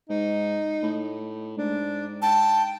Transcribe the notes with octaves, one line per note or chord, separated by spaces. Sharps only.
G#2 D#4
A2
G#2 D4
G5 A5